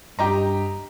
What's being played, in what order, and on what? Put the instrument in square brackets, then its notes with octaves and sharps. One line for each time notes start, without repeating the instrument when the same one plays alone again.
[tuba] G2 [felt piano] G4 D#5 A#5